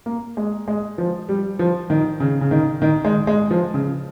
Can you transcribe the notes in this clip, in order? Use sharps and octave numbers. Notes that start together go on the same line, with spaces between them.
A#3
G#3
G#3
F3
G3
F3
D#3
C#3
C#3
D#3
D#3
G#3
G#3
F3
C#3